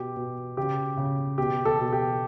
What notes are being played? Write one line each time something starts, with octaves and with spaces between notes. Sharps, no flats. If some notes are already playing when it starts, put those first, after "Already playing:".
Already playing: B2 G4
B2
C#3 G4
C#3
B2 G4
A4
B2
G4